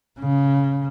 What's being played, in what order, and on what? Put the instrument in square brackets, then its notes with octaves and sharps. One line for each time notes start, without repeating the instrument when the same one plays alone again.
[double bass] C#3